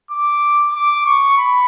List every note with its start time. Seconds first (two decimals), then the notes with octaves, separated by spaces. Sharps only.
0.11 D6
0.73 D6
1.05 C#6
1.37 B5